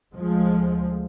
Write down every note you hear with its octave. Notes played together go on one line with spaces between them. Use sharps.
D2 F3 G#3